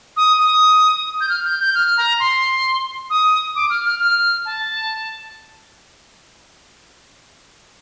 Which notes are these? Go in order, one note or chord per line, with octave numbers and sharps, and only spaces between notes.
D#6
D#6
G6
F6
G6
G6
F6
A#5
C6
D#6
D6
F6
F6
F6
A5